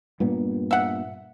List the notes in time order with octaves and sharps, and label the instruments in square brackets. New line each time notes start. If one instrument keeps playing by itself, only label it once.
[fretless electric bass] G2 A#2 B3
[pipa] E5 F#5